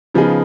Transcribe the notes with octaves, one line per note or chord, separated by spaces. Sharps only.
C#3 F3 B3 D#4 G#4